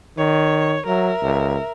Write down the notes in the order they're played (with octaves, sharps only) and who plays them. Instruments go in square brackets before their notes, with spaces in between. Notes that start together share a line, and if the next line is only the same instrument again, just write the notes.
[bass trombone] D#3 [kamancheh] C#5
[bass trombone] F#3 [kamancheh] A#4 E5
[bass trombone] C#2